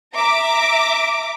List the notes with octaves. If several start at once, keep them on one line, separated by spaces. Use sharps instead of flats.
E5 A#5 D6